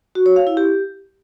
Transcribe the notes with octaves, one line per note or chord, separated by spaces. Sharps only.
F#4
C#5
F5
E4
G4